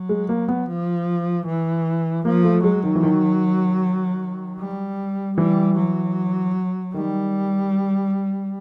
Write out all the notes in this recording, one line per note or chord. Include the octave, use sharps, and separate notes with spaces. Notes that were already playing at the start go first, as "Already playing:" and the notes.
Already playing: F#3
G#3
A#3
B3
F3
E3
F3 A#3
A3
F#3 G#3
D#3
E3
D#3
G3
E3 G3
F#3
D#3 G3